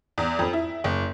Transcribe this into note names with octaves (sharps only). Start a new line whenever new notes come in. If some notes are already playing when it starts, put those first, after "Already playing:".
E2
F2
E4
F#1